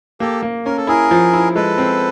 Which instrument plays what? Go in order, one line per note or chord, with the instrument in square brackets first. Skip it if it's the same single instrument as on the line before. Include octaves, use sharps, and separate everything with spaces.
[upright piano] A#3 [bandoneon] G4 A4
[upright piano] A#3
[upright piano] C#4 [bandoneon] A#4
[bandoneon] A4
[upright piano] E4 [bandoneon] G#4 A#4
[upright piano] F3
E4
[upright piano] G#3 [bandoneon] A4 B4
[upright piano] C4